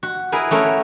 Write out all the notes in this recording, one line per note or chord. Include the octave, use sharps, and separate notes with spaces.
F#4
E4 G#4 A#4 B4
A3 C#4 F#4 A#4